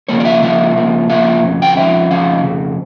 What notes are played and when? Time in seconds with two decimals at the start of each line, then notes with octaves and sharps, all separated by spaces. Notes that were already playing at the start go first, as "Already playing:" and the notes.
0.08 C#3 F3 A#3 C#5
0.20 D5
0.25 E5
0.42 C#3 F3 A#3 E5
0.76 C#3 F3 A#3
1.09 C#3 F3 A#3 E5
1.43 F2 C#3
1.62 G5
1.77 F2 C#3 F3 C#4 E5
2.10 F2 C#3 F3 C#4 F5
2.44 F2 C#3